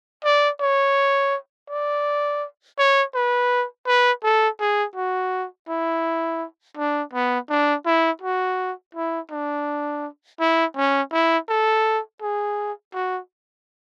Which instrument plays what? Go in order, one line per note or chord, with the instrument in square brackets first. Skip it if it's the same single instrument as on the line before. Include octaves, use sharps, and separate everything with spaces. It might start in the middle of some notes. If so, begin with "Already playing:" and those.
[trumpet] D5
C#5
D5
C#5
B4
B4
A4
G#4
F#4
E4
D4
B3
D4
E4
F#4
E4
D4
E4
C#4
E4
A4
G#4
F#4